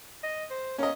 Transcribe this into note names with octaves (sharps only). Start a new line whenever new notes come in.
D#5
C5
A#3 C#4 D#5